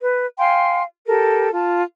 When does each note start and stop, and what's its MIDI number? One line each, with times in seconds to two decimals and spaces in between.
0.01 0.26 71
0.38 0.83 77
0.38 0.83 79
0.38 0.83 80
0.38 0.83 84
1.07 1.50 67
1.07 1.50 69
1.07 1.50 70
1.52 1.82 65
1.52 1.82 81